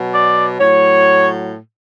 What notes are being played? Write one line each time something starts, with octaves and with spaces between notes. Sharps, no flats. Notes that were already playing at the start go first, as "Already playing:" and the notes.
Already playing: B2 F#3
D5
A2 F#3 C#5